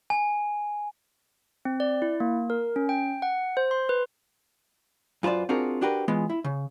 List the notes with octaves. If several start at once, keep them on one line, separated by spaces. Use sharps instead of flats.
G#5
C4
D5
E4
A#3
A#4
C#4
G5
F#5
C5
C6
B4
F#2 F4 B4 C5 D5
C4 D4 F4 F#4 G#4 A#4
D4 F#4 G4 A#4 B4
E3 G#3 B3 F4
E4
C#3